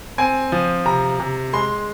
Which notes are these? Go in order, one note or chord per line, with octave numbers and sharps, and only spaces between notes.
C4 G#5
F3
C3 A#5
C3
G#3 C6